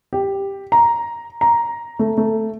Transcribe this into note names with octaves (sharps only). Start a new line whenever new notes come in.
G4
A#5
A#5
A3
A3